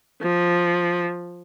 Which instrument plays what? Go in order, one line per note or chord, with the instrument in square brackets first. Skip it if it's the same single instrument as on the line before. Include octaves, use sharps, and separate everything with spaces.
[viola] F3